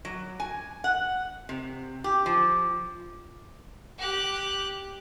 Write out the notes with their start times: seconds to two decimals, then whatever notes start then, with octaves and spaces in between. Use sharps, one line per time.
0.05 F#3
0.40 G#5
0.84 F#5
1.49 C3
2.04 G4
2.26 F3
3.98 G4 F#6